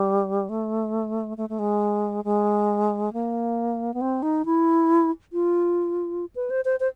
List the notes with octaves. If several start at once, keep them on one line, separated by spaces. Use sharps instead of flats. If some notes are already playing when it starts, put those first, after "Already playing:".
Already playing: G3
A3
A3
A3
G#3
G#3
A#3
B3
C4
D#4
E4
F4
B4
C5
C5
C5